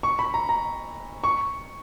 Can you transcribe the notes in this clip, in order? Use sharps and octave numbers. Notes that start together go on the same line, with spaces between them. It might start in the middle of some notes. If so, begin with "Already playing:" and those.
C#6
B5
A#5
A#5
C#6